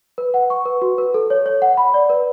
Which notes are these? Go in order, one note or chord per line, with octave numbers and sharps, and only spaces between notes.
B4
F#5
C#6
B4
F#4
B4
A4
C#5
C#5
F#5
B5
D5
B4